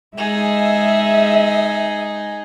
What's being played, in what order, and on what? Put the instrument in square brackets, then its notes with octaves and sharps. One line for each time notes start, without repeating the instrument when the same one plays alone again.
[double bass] G#3 [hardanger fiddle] D#4 G#4 [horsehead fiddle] E5